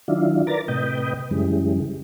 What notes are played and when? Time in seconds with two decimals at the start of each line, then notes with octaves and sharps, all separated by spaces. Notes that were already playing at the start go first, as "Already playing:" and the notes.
0.08 D#3 F#3 D4 E4 F4
0.47 A#4 B4 D5 A#5 A6
0.68 A2 C3 B4 D#5 G5
1.31 F#2 C#3 E3 G3 G#3